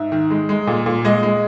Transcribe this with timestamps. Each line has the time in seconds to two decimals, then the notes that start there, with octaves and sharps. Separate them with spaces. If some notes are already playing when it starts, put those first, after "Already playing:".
Already playing: G#2 E5
0.12 D#3
0.30 G#3
0.49 G#3
0.67 A#2
0.86 A#2
1.05 G#3 D#5
1.23 G#3